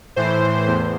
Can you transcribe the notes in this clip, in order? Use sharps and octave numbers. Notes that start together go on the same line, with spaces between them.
A2 E3 C5
E2